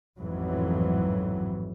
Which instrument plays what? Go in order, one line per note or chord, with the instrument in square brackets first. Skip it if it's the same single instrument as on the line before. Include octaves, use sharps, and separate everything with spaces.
[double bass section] A1 F2 G#2 E3 F#3